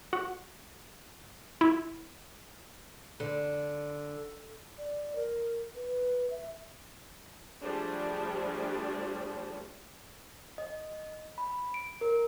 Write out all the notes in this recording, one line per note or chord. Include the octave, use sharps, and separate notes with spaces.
F#4
E4
D3
D5
A#4
B4
E5
F3 G3 A3 D4 G#4 C5
D#5
B5
D7
A#4